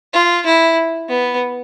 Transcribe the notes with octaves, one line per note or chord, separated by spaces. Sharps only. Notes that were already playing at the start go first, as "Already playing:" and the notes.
F4
E4
B3